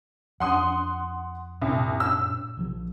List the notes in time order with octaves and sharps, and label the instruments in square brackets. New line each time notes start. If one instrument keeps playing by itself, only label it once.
[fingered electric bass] F2 [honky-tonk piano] F#5 C6 D#6
[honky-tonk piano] C2 [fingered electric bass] F#2 A#2
[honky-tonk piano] E6
[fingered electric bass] A#1 D#3 F3